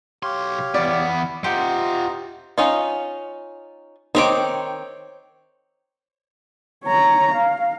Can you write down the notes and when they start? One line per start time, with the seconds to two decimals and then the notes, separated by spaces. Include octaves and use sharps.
0.23 B1 G4 C#5 F5 C6
0.74 E3 B3 D5
1.07 E4
1.44 F4 G4 C5 D#5 F#5 A#5
2.58 C#4 D#4 F4
4.15 D#3 C4 D#4 C5 C#5 D6
6.84 C#5 A#5
7.34 F5